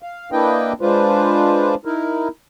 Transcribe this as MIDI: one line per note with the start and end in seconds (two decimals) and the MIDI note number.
0.03 0.30 77
0.32 0.73 58
0.32 0.73 62
0.32 0.73 64
0.32 0.73 71
0.32 0.73 75
0.32 0.73 79
0.81 1.75 56
0.81 1.75 62
0.81 1.75 65
0.81 1.75 71
0.81 1.75 72
1.85 2.28 63
1.85 2.28 64
1.85 2.28 70